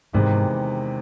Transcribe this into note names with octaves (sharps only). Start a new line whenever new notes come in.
E2 G#2 C3 D#3 G#3 B3